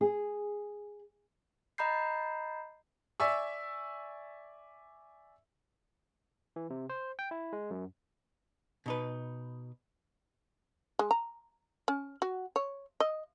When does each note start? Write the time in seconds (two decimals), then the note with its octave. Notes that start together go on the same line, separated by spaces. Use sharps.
0.01 G#4
1.78 D#5 A#5 B5 G6 C7
3.20 D5 E5 G#5 C#6 E6
6.56 E3
6.70 C3
6.90 C5
7.19 G5
7.31 E4
7.53 G#3
7.71 F#2
8.86 B2 D#4 B4
10.99 G#3
11.11 A#5
11.88 C#4
12.22 F#4
12.56 C#5
13.00 D#5